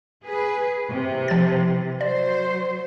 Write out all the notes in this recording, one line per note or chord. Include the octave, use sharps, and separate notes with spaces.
G#4 B4
C3 E3
F3 A6
F#3 C5 D5